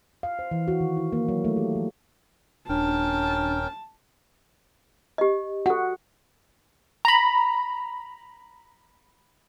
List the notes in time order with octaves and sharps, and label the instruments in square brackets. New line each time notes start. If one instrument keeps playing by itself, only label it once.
[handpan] F5
C5
E3
F#4
D#3
E4
A#3
F#3
A3
G4
F3
[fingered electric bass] D#1 [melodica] C#4 A#4 G5 [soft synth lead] D4 [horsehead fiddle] A5
[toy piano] G4 D#5
[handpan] F#4 [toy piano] A4 F#5
[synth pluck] A#5 B5